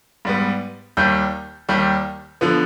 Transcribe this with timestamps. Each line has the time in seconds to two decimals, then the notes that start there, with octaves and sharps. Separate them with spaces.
0.25 G#2 G3 B3
0.97 D#2 D#3 G3 G6
1.69 D#2 D#3 G3
2.41 D3 F3 B3